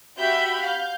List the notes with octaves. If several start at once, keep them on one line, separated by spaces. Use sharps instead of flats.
F#4 G4 E5 B5 G6
F5 G6